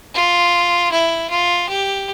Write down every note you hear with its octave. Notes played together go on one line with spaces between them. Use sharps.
F4
E4
F4
G4